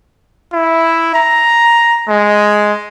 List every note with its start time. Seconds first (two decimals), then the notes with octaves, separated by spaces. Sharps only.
0.53 E4
1.14 A#5
2.08 G#3